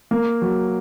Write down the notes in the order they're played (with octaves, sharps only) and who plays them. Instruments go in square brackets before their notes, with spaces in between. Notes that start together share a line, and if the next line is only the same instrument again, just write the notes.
[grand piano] A#3
F#3